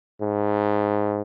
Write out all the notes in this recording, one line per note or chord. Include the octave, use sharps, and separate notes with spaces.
G#2